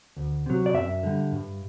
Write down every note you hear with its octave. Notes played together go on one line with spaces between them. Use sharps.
D2
C3 F#3
D5
F#2 E5
D3 G3
G2